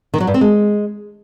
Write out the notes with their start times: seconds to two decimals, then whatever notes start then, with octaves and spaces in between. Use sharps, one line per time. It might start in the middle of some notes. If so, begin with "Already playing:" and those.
0.14 D#3
0.20 F#3
0.27 G2
0.34 C4
0.41 G#3